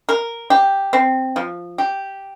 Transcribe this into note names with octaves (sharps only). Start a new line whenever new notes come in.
A#4
G4
C4
F3
G4